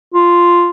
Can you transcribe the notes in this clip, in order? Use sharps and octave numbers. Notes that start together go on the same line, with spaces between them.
F4